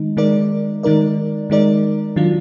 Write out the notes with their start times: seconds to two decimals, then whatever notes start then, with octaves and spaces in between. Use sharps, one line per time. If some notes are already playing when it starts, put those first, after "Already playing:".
Already playing: D#3 G#3 D#4
0.17 D#3 G#3 D#4 A#4 D5
0.83 D#3 G#3 D#4 A#4 D5
1.50 D#3 G#3 D#4 A#4 D5
2.16 D#3 F#3 D4 F4